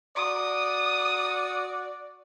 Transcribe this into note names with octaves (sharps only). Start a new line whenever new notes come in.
F#4 D5 D#6